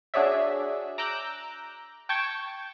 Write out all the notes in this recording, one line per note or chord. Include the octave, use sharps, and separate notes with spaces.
D4 F#4 G#4 C#5 D5 E5
A#5 D6 E6 F#6 G6
G5 A5 C#6 G#6